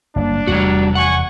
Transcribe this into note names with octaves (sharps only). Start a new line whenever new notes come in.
F#1 G3 A#3 D4
F1 E2 G3 A3 F#4
F#5 G#5 C#6